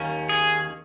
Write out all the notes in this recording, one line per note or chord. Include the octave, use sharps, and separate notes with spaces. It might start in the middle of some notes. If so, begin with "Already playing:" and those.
Already playing: D#2 D#3 A#3 C#4
G#4